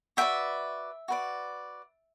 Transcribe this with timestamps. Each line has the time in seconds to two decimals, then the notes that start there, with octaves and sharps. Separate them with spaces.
0.17 F#4 B4 D5 E5 G5
1.08 F#4 B4 D5